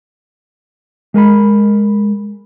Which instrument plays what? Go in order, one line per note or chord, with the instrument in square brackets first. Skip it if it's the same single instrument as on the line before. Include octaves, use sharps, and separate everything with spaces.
[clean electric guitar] G#3 A#4 G#5 B5